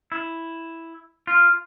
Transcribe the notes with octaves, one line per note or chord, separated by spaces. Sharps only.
E4
F4